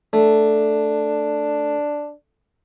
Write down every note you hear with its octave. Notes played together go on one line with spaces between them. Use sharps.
A3 D4